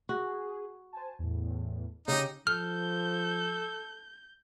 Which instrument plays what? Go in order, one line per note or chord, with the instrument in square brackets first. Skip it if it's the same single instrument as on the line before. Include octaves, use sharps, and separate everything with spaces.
[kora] F#4 [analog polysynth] G#4
[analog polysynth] C5 G#5 A5
E2 A2
[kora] C#3 G4 [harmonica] D#4
[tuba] F3 [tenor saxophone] A4 [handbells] F6 [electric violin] G6